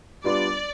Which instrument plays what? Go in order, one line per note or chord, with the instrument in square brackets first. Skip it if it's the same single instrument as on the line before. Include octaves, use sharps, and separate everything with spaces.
[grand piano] G3 B3 D4 F4 [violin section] D5